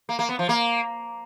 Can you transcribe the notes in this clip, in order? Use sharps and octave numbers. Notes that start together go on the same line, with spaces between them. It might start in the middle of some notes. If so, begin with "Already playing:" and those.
A#3
A#3
B3
F3
A#3